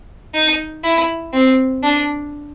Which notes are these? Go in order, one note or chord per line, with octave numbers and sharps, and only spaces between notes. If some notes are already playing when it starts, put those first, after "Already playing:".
D#4
E4
C4
D4